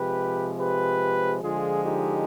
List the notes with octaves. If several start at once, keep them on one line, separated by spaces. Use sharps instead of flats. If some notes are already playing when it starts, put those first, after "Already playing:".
Already playing: C3 F3 G#3 G4 B4
G4 B4
D3 F3 G#3 F4 G#4
D#4 G4